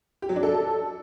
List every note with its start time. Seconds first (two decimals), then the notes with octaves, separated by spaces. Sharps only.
0.22 G4
0.29 F#3
0.36 D4
0.43 A4